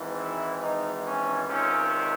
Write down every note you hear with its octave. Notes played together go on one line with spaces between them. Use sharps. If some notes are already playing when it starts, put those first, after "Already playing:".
Already playing: G#1 G#2 E3
E4
D#4
C#4
C#2 C3 D#3 C#4